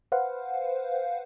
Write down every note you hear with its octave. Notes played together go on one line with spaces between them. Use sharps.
B4 C5 F5 F#5